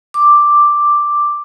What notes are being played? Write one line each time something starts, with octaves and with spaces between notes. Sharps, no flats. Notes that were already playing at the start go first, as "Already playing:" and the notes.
D6